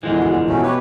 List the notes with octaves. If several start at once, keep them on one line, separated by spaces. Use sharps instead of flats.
E2 A#2 D3 E3 F3 G#3
F#4
A#3
B2 F#3 A3 C#4
G4 B4 C#5